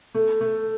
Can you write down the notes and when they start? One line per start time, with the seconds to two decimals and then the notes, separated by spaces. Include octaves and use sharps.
0.14 A3
0.41 A3